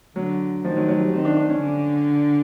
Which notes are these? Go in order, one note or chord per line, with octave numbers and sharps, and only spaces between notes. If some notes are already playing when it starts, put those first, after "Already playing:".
D3 F#3
D#3 F3
F#3
F#3
G3
D#3 C4
D4
D4
C#4
D3